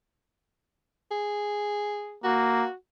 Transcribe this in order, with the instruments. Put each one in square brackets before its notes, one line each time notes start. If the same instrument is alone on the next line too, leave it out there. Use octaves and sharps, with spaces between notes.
[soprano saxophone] G#4
[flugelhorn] A#3 [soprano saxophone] F#4